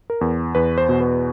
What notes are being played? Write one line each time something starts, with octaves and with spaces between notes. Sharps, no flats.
A#4
E2
E2 B4
C5
B2
B4